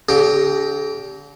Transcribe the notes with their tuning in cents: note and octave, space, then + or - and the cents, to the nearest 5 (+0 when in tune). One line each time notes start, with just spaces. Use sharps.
D3 -40 G4 +0